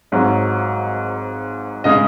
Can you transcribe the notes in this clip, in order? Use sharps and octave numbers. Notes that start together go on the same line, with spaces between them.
G#1 G#2 F#3
C#3 G#3 D#5